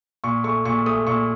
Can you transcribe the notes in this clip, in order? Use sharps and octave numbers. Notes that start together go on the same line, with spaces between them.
A#2 C#6
A3 C#6
A#2 C#6
A3 D#6
A#2 C#6